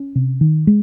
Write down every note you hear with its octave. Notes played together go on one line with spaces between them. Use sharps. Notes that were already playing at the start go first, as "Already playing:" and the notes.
Already playing: C#4
C3
D#3
G#3